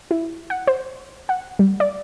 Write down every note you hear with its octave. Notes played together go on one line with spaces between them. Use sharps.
E4
F#5
C5
F#5
G3
D5